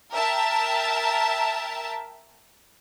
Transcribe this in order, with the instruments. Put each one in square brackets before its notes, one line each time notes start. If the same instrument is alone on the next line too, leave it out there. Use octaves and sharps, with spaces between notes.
[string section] A#4 E5 G5 A5